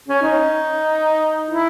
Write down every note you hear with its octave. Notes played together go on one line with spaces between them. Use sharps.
C#4
D#4
E4